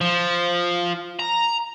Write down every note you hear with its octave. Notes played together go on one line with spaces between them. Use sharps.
F3
A#5